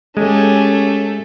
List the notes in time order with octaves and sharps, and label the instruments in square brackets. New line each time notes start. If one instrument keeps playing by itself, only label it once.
[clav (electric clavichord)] G#3 [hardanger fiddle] A3 A4 [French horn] C#4 [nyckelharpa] G4 G#5